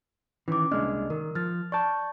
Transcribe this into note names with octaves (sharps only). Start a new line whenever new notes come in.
D#3 E3 C#4 D6
C2 G#3 A#3 D4 D#5 F6
D#3 A#4
F3 F6 A6
D5 A5 C#6 G6